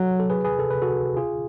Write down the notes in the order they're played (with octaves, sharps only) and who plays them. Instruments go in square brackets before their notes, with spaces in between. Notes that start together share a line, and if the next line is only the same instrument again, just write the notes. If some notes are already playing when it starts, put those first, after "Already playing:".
Already playing: [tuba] F#3 [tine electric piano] F#4 A4
[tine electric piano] A4
G#4 B4
G#4 B4
A4
B4
F#4 A4
F4 G#4